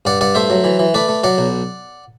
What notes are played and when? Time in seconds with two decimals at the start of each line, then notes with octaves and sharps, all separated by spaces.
0.05 G2 D5 F#5
0.21 G2 D5 F#5
0.35 A3 C5 E5
0.50 F#3
0.64 E3
0.79 E3
0.94 A3 B4 D5
1.08 A3
1.24 F#3 D5 F#5
1.38 B1